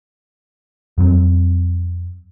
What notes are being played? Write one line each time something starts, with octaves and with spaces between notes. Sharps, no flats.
F2 F#3 G#3 C4